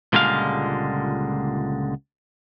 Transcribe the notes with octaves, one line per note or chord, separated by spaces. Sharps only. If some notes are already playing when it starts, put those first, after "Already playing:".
C#2 A#2 D3 G3 G#3 F5